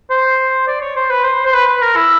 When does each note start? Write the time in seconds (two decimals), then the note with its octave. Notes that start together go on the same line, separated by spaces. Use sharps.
0.10 C5
0.67 D5
0.81 C#5
0.96 C5
1.10 B4
1.24 C5
1.46 C5
1.53 B4
1.67 B4
1.82 A#4
1.96 E4